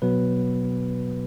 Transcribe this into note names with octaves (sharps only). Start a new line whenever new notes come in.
B2 F#3 B3 B4